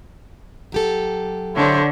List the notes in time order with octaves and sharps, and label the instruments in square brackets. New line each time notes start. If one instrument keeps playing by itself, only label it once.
[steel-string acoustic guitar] F#3 G4 A4
[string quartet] D3 [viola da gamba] D4 C#5 [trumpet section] E4 C5